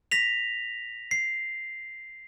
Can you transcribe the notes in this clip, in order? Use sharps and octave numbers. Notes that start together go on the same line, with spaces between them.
A#6 B6 F7
C7